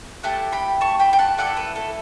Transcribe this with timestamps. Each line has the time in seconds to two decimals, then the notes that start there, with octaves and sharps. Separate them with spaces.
0.23 A3 E4 G4 F#5 A5
0.52 G5 B5
0.81 A5 C#6
0.99 G5 B5
1.13 G5
1.19 F#5 A5
1.38 A3 E4 A4 D5 F#5
1.57 B4
1.76 A4